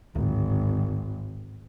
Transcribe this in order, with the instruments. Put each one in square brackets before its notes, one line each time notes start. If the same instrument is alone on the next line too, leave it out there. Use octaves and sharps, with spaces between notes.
[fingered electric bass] D1 [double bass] G#1